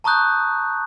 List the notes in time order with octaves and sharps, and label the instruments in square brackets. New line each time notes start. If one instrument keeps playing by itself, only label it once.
[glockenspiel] A5 A#5 C#6 D#6 F#6 G6